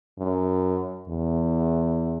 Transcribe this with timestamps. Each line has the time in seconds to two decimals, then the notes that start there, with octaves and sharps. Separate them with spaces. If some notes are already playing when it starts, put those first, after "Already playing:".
0.19 F#2
1.08 E2